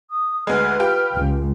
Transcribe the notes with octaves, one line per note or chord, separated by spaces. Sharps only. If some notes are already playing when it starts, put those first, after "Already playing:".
D#6
D2 G#3 B4 F6
F4 G4 G5
C#2